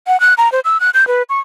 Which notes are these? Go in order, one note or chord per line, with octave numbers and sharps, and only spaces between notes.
F#5
F#6
A#5
C5
E6
F#6
G6
B4
C#6